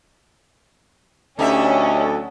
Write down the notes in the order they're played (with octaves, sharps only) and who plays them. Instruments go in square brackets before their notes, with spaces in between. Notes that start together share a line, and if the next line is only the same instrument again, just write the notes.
[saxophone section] D2 F#3 A4 [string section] C#4 [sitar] D#4 G4 E5